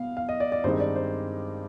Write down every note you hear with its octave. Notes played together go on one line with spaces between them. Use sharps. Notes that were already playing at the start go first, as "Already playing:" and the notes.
Already playing: B2 B3 F5
F5
D#5
D5
D5
G2 D#3 G#3 C4 D#4 C5
D5
C5